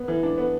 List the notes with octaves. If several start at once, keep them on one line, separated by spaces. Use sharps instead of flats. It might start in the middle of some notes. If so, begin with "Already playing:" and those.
Already playing: B3
E3
D4
B3